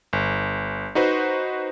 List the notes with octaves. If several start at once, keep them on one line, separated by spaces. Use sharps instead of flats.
G1
D#4 F#4 B4 C5